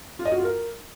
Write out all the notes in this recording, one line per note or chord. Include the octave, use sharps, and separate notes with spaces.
F4
D#5
F#4
F4
A#4